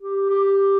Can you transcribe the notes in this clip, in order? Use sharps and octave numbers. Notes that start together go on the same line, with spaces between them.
G4
G4